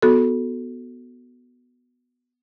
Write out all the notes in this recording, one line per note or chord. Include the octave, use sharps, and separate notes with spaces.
B3 F#4 A4